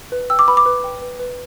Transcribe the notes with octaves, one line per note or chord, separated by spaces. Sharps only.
B4
G5 E6
D6
B4 B5
D6
B4
G5
B4
B4